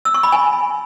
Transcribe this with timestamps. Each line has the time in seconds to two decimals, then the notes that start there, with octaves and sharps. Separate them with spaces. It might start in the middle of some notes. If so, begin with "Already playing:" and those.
0.05 E6
0.14 C#6
0.23 B5
0.32 G#5